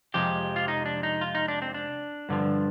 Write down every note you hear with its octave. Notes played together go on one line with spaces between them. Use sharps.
F2 C3 F3 G#3 G4
F4
D#4
D4
D#4
F4
D#4
D4
C4
D4
G2 D3 F3